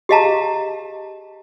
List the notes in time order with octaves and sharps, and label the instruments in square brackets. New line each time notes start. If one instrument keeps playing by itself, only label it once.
[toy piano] G4 G#4 D#5 F5 A5 A#5